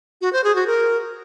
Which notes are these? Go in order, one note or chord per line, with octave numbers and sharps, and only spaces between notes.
F#4
C5
G#4
F#4
A#4